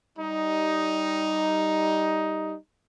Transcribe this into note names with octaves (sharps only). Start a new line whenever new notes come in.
G3 D#4